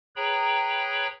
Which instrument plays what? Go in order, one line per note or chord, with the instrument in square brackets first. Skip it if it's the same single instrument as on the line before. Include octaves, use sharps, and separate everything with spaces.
[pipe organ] G#4 B4 C#5 G5 A#5 B5